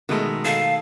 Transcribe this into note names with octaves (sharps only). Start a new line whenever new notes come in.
B2 D#3 G#3 A3
A4 F5 G#5 A5